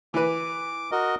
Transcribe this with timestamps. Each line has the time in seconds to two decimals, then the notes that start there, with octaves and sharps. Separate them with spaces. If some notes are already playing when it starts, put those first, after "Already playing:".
0.14 E3 B4 D6
0.92 F#4 A#4 D#5